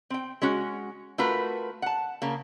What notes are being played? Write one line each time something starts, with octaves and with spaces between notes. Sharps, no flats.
C4 G5
G#3 C#4 F#4
A3 F4 F#4 A#4 B4
F#5 A5
C#3 A#3